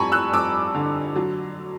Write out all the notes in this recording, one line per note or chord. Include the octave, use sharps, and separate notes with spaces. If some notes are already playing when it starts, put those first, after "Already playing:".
Already playing: F2 G3 G#5 A#5 B5 C#6
E6 F#6
F2 D6 E6
D3
F#3